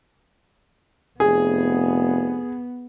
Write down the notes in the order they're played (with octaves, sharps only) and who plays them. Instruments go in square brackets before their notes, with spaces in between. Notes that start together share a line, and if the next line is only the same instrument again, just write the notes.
[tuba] F1 [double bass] B3 [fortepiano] G#4